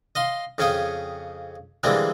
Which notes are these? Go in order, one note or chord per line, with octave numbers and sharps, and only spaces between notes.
D#5 F5 C6
F2 C#3 C#4 F5 G5 D#6
D3 E3 G3 G#3 A#3 C4